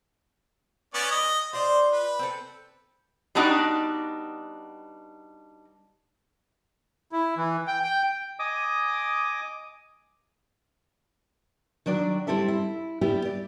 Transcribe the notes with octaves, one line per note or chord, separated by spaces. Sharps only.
B3 C#4 D5
D#5
F4 C5 D5
B4
C4 A4
G3 B3 D4 D#4 F#4 D5
E4
E3
G5
G5
D#5 G#5 D6 D#6
D#3 F#3 D4 D5
G3 C4 E4 A4 E5
E4
G3 B3 E4 G4
D5